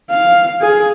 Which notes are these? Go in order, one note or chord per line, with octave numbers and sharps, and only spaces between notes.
F5
G#4